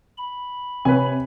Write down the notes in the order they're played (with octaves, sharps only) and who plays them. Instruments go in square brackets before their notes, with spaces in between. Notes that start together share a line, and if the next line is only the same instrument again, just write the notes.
[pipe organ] B5
[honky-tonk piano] C3 [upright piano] B4 C#5 G#5